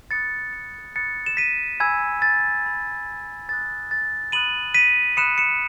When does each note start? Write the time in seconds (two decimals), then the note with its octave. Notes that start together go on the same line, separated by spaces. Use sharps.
0.11 B5 D#6 F#6 A6 C#7
0.53 A6 C#7
0.96 B5 D#6 F#6 A6 C#7
1.26 E7
1.37 B6 D#7
1.80 G#5 B5 E6 G#6
2.22 A6
2.65 G#5 B5 E6
3.49 B5 D#6 F#6 A6
3.91 A6
4.32 B5 D#6 F#6 D#7 F#7
4.74 B6 D#7
5.17 B5 D#6 F#6 C#7 E7
5.38 C#7 E7